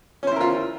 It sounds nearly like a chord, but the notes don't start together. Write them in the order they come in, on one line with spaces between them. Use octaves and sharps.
C#4 C5 E4 A#4 F4